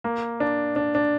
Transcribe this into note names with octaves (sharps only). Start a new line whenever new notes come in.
A#3
D4
D4
D4